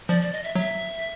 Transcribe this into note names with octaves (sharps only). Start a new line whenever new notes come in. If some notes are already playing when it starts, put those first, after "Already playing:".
F3 D5
D5
D#5
E5
F#3 E5